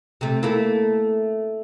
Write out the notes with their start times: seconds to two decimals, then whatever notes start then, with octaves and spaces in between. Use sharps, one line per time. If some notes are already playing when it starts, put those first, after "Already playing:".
0.21 C3 A3
0.43 A3 A#3 E4